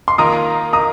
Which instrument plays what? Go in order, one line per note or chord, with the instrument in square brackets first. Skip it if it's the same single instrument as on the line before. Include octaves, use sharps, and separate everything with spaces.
[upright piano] C6
[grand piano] D#3 A#3 F4 A#4 [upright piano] A#5 D#6
[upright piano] A#5 D#6